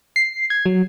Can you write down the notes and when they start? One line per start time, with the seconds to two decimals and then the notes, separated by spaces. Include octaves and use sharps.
0.16 C7
0.50 G#6
0.66 F#3